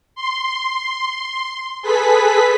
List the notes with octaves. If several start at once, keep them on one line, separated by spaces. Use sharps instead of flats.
C6
G#4 A4 B4 B6